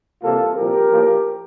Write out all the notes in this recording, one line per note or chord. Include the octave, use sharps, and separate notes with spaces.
C2 C3 E3 A#3 F4 A4
C2 A#2 F3 G4 A#4
A2 F3 A#3